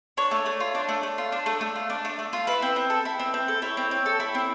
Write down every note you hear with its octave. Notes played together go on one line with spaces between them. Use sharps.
D4 C#5
A3
A3
F4
D4
A3
A3
F4
D4
A3
A3
F4
D4
A3
A3
F4
E4 B4
C4
C4
A4
E4
C4
C4
A4
E4 C#5
C4
C4
A4
E4
C4